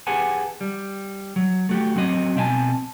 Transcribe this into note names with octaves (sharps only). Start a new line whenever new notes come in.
G4 G#4 B4 F#5 G#5 A5
G3
F#3
A3 F#4 G4
F#3 C4 F#4 D#5
B2 C4 E5 G#5 A5